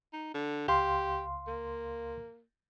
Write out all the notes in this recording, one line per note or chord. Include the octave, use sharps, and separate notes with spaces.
D#4
D3
C#2 G4 F5 C6
A#3